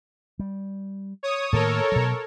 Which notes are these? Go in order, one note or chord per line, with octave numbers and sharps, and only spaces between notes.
G3
C#5 D#6
A2 D#3 A#3 A4 A#4 C#5
B2 F#3